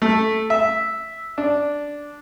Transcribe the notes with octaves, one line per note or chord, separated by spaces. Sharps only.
A3
E5
D4